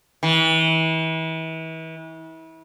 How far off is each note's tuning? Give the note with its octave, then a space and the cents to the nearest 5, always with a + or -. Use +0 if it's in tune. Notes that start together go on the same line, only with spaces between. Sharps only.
E3 -35